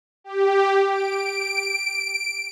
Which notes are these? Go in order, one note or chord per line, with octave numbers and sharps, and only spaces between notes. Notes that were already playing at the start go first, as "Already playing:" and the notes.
G4
D7